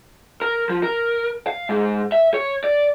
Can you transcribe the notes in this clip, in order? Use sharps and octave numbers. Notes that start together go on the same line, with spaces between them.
A#4
F3
A#4
F5
G#2
E5
C#5
D5